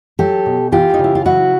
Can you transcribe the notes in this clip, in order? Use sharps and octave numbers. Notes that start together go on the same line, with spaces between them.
F#3 G4 A4
B2
E3 F4 G4
D#4
C#3
E4
F4
F#3 E4 F#4